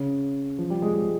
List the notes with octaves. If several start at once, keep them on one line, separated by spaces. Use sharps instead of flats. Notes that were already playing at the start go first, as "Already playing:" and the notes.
Already playing: C#3
F3
G3
G#3
G#3